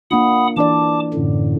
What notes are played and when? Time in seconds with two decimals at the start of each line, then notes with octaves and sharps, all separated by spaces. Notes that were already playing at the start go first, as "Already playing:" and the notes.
0.11 A#3 D4 F4 F#5 B5 D#6
0.57 E3 D4 D5 A5 D6
1.14 F#2 A2 D3